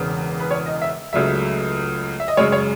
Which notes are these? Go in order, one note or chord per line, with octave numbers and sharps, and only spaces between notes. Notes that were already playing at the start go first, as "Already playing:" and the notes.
Already playing: E1 E2 C#3
B4
C#5
D#5
E5
C#2 C#3 F#3 A3 E5
E5
D#5
F#2 C#3 G#3 C#5
C#5